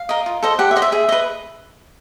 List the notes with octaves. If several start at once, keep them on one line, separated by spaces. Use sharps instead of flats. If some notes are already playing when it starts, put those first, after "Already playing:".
Already playing: F5
A#4 D#5
F4
A4 C5 D#5
G4 F#5
E5
C5 D#5
E5
G#4 E5
B4 D#5